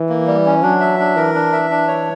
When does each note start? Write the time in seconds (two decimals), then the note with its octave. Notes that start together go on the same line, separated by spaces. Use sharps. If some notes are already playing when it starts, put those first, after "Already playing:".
Already playing: E3
0.09 A#3
0.27 G3
0.46 C#4
0.63 F#3 D4
0.80 E5
0.99 D4
1.16 E3 A#4
1.34 D4
1.52 E5
1.70 D4
1.87 C#5